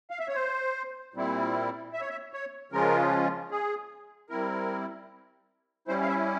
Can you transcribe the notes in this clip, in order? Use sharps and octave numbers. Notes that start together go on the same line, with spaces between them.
F5
E5
C#5
C5
A#2 G3 C4 E4
E5
C#5
E5
C#5
C#3 F3 G#3 C#4 F4 A#4
G#4
G3 C4 E4 A#4
G3 C#4 E4 C5
F5
E5